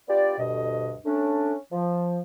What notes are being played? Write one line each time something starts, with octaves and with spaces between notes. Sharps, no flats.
B3 D4 F4 G4 D5
D2 G2 B2 D#5
A3 C#4 D4
F3